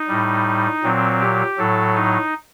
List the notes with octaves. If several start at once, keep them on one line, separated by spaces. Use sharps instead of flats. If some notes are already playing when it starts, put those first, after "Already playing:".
Already playing: D#4
A2 G3
A#2 F#3 C4
G4
A2 F#3 A4
D#4